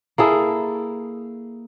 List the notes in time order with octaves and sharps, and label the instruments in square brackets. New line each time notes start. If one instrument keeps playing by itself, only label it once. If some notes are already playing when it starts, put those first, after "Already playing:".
[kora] A#3 E4 G#4 A4